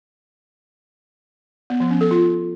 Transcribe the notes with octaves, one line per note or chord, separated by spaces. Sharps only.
B3
F3
C#4
A4
F4